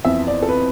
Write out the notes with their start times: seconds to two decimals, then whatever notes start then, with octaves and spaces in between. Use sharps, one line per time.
0.05 F2 E3 B3 E5
0.27 D5
0.42 A4
0.49 B4